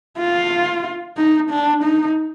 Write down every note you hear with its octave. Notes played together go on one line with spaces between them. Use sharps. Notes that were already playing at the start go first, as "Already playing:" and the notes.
F4
D#4
D4
D#4